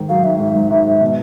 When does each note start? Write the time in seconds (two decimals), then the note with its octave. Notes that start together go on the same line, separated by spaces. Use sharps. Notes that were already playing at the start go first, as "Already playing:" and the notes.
Already playing: G#2 D#3
0.09 F#3 F5
0.24 G#2 E5
0.40 G#2
0.55 G#2
0.70 G#2
0.86 G#2
1.01 B2